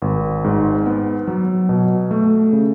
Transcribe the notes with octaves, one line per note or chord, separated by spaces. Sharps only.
G#1
G#2
B3
F#3
B2
A3
C#3